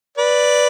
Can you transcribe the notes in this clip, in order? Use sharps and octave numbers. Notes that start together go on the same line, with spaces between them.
B4 D5